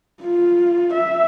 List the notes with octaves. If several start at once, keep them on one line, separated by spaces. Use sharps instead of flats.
F4
E5